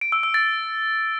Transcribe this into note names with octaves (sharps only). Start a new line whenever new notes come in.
D7
E6
E6
A6